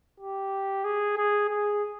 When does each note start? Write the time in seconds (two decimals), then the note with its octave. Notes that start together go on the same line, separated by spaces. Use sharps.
0.20 G4
0.84 G#4
1.17 G#4
1.50 G#4